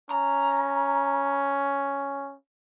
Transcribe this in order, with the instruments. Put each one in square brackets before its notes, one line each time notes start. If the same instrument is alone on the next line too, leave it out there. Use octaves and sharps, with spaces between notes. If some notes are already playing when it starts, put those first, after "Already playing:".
[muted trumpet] C#4 [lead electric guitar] A#5